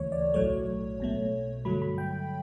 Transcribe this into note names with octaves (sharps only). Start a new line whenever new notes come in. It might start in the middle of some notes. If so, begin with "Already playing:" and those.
Already playing: D2 C#3 E3 A3 C#5
D5
B1 A2 F#3 A3 C#5
B1 B2 A3
G2 D3 F#3 A3 B5
B5
G5